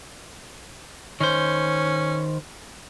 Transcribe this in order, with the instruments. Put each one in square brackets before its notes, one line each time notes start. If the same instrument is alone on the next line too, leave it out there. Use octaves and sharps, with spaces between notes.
[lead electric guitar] D#3 C5 [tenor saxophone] C#4